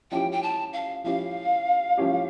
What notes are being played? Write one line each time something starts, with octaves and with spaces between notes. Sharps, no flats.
F3 C#4 E4 G4 G5
G5
A5
F5
F3 C#4 E4 G4 F5
F3 C#4 E4 G4